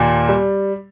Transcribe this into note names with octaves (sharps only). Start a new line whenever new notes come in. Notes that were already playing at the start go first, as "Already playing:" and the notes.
Already playing: D#2 A#2
G3